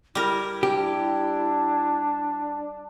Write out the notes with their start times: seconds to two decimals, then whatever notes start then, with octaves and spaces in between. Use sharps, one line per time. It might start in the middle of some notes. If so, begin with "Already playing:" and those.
0.15 G3 E4 A#4
0.63 D4 G4